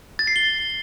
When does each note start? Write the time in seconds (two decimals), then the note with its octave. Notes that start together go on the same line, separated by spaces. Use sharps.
0.19 A6
0.27 C7
0.36 G7